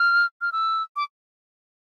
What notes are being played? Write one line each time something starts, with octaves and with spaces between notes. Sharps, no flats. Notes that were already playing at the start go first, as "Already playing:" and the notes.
Already playing: F6
F6
E6
D6